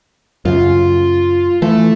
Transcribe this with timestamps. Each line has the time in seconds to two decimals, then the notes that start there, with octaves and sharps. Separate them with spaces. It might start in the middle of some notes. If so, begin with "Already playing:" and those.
0.45 F#2 C#3 F4
1.62 E3 A3